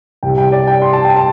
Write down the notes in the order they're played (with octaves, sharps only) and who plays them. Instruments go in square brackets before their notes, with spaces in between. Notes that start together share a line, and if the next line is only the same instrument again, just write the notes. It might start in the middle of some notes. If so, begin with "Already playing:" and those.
[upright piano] C2 C3 G3 G5
G5
D5
G5
C6
A5
G5
A5